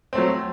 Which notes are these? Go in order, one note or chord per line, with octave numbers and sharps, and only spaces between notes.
F#3 A3 C4